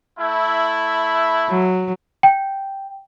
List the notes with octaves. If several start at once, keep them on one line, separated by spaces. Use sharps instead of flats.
A3 E4
F#3
G5